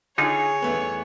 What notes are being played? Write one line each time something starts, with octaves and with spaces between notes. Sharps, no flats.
D3 D#4 F4 G#4 C#5 G#5
E2 A3 B3